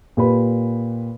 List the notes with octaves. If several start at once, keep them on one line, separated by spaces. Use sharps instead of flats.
A#2 G4 B4 B5